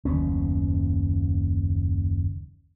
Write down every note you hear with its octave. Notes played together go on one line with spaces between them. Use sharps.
F#1 D#2 B3 C#4